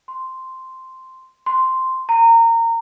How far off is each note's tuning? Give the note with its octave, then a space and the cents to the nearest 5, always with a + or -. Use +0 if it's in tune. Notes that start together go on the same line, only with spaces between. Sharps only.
C6 -5
C6 -5
A#5 -25